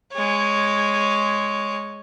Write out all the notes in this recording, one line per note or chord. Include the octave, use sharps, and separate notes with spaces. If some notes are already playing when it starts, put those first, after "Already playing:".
G#3 C#5